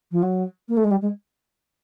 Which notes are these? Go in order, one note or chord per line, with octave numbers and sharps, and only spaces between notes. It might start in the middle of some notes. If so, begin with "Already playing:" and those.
F3
F#3
A#3
A3
G#3
G3
G#3